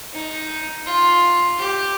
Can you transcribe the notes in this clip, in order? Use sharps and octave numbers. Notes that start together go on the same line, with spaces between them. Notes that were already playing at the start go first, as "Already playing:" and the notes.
D#4
F4
G4